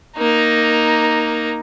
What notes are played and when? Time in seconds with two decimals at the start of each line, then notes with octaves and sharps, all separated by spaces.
0.17 A#3 D#4